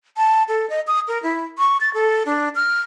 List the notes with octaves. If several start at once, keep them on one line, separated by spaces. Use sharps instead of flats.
A5
A4
D#5
D#6
A#4
E4
C#6
A6
A4
D4
F6